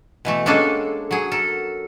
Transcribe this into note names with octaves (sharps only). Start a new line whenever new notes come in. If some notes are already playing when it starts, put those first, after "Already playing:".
B2 E3 A3
G#3 A#3 C#4 D4 G#4 A4
F#3 G#4
A4 A#4